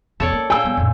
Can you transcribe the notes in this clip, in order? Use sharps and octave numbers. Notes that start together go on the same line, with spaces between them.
E2 C3 A4 C#5 D5
A#3
A#2 G5 G#5 E6
G3 B3
F2 A2